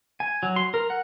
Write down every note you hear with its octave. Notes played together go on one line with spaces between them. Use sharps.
G#5
F#3
C6
A#4
F#5